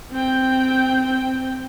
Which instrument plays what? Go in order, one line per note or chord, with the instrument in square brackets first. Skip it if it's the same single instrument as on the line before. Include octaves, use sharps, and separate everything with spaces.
[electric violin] C4 G5